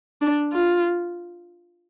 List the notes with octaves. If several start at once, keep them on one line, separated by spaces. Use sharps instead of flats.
D4
F4